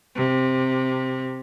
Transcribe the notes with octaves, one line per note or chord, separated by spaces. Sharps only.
C3